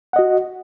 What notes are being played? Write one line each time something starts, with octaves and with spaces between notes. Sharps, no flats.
F#4 D#5 F#5